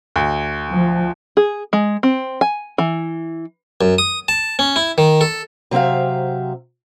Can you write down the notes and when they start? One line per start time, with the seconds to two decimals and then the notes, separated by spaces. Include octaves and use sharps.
0.16 D2
0.73 F3
1.37 G#4
1.73 G#3
2.03 C4
2.41 G#5
2.78 E3
3.81 F#2
3.98 D#6
4.28 A5
4.59 C#4
4.76 E4
4.98 D#3
5.21 A4
5.71 C3 F#3 C4 E5 F5